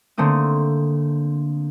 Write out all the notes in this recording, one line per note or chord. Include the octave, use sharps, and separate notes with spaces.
D3 A3 A#3 C4 D#6